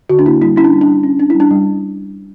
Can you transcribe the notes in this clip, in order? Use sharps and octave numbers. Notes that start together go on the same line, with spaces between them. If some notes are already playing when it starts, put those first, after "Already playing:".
D3 F#4
D4
A#3 E4
G3 E4
C#4 E4
D4
G3
D4
G3
C#4
C#4 D4
G3 E4
D4
G3